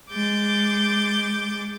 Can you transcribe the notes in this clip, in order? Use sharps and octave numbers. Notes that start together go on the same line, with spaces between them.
G#3 D6 G6 A6